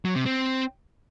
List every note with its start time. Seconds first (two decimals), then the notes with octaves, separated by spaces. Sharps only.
0.05 F#3
0.15 C3
0.26 C4